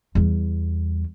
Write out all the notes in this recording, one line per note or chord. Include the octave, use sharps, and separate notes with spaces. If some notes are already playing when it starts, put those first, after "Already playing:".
E2 G3